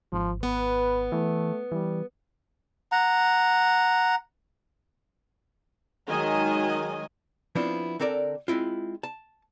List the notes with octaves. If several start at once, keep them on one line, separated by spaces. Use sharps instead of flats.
G#1 F3
B3 B4
E3 A3
E3 G3
F#5 A#5
D#3 F#3 G#3 D#5 G#5
F3 B3 C4 D4 E4 F4
D3 C4 A4 A#4 D5
G#3 C4 E4 F4
A5